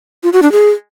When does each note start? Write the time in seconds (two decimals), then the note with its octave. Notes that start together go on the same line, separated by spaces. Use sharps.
0.23 F4
0.33 F#4
0.42 D4
0.52 G#4